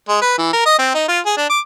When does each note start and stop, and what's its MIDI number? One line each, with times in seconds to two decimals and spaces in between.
0.09 0.18 56
0.22 0.37 71
0.38 0.49 52
0.53 0.61 70
0.66 0.78 75
0.78 0.91 60
0.94 1.07 63
1.08 1.20 65
1.26 1.34 68
1.37 1.49 62
1.49 1.60 86